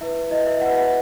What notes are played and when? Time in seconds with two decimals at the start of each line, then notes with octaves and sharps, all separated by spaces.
0.01 E4 B4 E5
0.31 E4 B4 D#5
0.47 E5
0.61 E4 B4 F#5
0.78 F#5